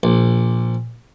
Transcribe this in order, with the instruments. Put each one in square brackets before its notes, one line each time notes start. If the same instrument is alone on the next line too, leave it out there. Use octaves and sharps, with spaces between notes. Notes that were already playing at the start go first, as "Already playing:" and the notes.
[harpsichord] A#1